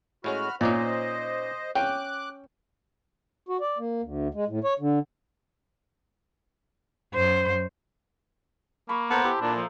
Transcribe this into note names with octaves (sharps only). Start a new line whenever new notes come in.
A2 G#3 C#4 F#4 B5 F6
A#2 C#4 D#4 C5 D5 D#5
C#4 G5 D6 F#6
F#4
D5
A#3
D2
G#3
A2
C#5
D3
F#2 C5
A#3 B5 C#6
B3 A4 C5 A#5
E4 G4
A#2 D4
F3